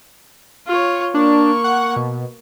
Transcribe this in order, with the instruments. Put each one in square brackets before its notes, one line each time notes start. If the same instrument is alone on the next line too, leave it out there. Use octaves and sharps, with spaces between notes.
[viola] F4 C#5
[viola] A#3 C#6 [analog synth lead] D4
[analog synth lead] F#5
B2